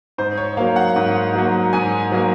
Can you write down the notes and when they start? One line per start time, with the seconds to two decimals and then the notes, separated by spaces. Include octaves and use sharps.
0.18 G#2 C5
0.37 C#5
0.57 F#3 A#3 F5
0.76 F#5
0.96 G#2
1.35 F#3 A#3
1.73 G#2 G#5
2.12 F#3 A#3